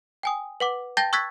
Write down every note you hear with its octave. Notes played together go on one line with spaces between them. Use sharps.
G5 G#5 D#6
B4 F#5 D6
G5 A5 G6 A6 A#6 G7
C#6 E6 F#6 G#6 A6 B6